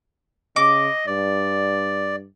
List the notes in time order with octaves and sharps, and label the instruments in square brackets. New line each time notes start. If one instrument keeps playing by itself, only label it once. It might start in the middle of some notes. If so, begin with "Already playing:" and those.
[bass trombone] C#3 [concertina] D#5 [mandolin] D6
[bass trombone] G2 [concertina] D5